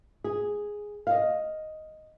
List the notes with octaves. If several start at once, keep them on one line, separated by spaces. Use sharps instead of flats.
G#4
D#5 F5